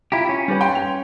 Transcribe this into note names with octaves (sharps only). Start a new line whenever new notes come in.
E4 F4 G4 A#5
C#4
G3 G4 B4
G5 C6
F7